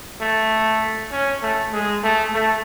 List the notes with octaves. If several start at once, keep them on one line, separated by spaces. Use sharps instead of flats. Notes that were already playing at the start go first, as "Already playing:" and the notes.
A3
C#4
A3
G#3
A3
A3